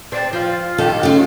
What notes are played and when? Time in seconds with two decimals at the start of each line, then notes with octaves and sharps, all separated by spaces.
0.12 C4 D5
0.33 F3 F4
0.78 D#3 D#4 G4 A4
1.03 C#3 A3